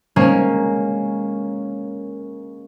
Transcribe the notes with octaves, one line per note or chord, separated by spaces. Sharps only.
G#3 A#3 C#4